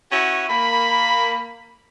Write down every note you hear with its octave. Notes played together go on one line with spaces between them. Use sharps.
C#4 E4 F#4
A#3 B5